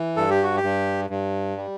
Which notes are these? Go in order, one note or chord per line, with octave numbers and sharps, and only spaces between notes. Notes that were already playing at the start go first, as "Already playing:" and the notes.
Already playing: E3
G2 A4
G4
F#4
G4
G2
G2
G3